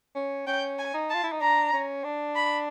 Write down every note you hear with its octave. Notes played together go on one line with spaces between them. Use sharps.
C#4
C#4 G5
G#5
D#4
F4 A5
E4
D#4
D4 A#5
C#4
D4
B5